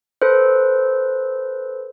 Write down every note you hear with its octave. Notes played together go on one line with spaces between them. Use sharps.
A4 B4 C5